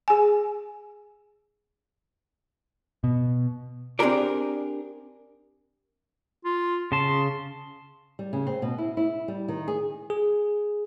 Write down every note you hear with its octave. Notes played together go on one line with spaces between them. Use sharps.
G#4 G#5
B2
C4 D4 G4 G#4 A#4 D5
F4
C#3 A5 C6
G3
C#3
C4
B2
E4
E4
G3
D#3
G#4
G#4